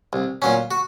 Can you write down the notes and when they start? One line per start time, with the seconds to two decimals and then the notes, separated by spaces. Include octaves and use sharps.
0.13 C2
0.42 A#2 F#3 C#4
0.71 F#4